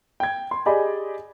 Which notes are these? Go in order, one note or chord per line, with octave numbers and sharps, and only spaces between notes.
G5 G#6
C6
G4 G#4 D5 D#5 G#5 B5